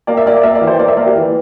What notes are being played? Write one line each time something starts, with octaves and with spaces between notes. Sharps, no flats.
A#3 D5
E5
A#3 D5
A#3 E5
D5
E3
C5
A#3 D5
E5
A#3 D5
G4
E3